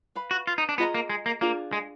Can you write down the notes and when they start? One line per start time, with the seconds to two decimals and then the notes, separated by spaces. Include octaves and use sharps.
0.15 B4 F5 B5
0.31 F#4
0.47 F4
0.58 D#4
0.69 D4
0.78 B3 F4 G#4 D#5 A#5
0.94 A#3
1.10 G#3
1.26 A#3
1.41 A#3 D4 F4 G#4
1.73 G#3